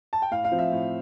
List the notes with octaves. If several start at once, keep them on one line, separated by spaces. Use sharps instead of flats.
A5
G5
A2 F5
F5
F3 C4
E5
A2